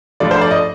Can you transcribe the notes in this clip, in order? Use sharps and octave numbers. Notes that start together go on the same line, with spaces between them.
G2 F3 A3 D5
C5
D5
D#5